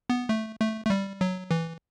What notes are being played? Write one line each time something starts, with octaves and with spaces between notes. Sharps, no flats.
B3
A3
A3
A3
G3
F#3
E3